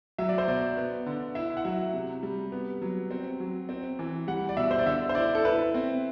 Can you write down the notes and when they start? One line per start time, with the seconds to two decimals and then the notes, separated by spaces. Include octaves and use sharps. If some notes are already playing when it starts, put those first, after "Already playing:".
0.18 F#3 E5
0.29 D5
0.38 C5
0.48 B2 D5
0.77 B3
1.06 D3
1.35 E4 E5
1.57 F#5
1.64 F#3 E5
1.93 C3
2.23 G3
2.52 B3
2.82 F#3
3.11 C4
3.40 F#3
3.69 C4
3.99 E3
4.27 G3 F#5
4.49 D5
4.56 B2 E5
4.71 C5
4.79 D5
4.86 D3 E5
5.09 C5
5.15 E4 D5
5.35 A4
5.45 E4 B4
5.74 C4